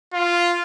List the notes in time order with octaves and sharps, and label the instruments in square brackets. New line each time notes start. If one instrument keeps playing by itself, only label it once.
[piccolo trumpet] F4